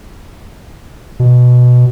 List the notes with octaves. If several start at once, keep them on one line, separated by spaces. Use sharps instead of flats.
B2